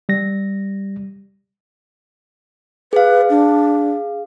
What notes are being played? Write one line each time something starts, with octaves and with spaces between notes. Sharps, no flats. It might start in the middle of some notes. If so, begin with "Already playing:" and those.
G3 A#6
G#4 B4 F5
D4